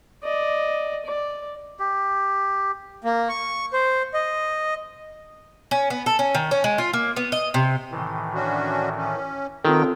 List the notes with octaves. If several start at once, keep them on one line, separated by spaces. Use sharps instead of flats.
D5 D#5
D5
G4
A#3
C#6
C5
D#5
C#4
B3
A4
C#4
D#3
C#4
G#3
F4
A#3
B3
D#5
C3
A2 D#3 E3
C#4 D4 F#4
C#4
D#3 B3 C4 F4 A4 G5